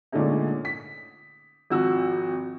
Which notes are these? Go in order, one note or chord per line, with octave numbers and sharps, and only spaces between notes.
A#2 D3 G#3 A3 C#4 D#4
B6
G#1 F3 F#4 E6